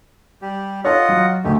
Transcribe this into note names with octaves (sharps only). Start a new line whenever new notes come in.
G3 G4
F4 A4 C#5 D#5 F#5
F#3
D2 D3 G#3 A3 G4